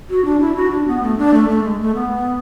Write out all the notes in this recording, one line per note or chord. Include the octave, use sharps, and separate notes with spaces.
F#4
D4
E4
F#4
D4
B3
A3
D4
A3
A3
G#3
A3
B3